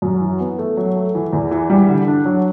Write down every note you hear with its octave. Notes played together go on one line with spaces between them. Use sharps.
F#2
E3
B3
A3
F#3
A3
E3
E2
E3
G3
D3
D4
F#3